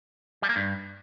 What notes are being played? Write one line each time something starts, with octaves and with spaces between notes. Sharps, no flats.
G3
A#3
G2